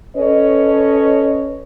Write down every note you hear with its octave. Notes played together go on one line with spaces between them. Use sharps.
C#4 A4 B4 C#5 D#5